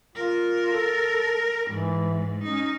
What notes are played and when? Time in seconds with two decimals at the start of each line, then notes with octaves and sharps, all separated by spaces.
0.16 F4 A#4
0.73 A4
1.70 G#2 E3
2.43 C#4 D#4